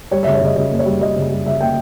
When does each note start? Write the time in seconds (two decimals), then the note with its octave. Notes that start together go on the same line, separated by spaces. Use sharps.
0.11 G3 C#5
0.23 C#3 E5
0.34 C#5
0.41 C#3 D#5
0.56 C#3 D#5
0.71 A#3
0.79 C#5
0.86 G3
1.01 G3 D#5
1.16 C#3
1.30 G3
1.46 C#3 E5
1.60 A#3 G5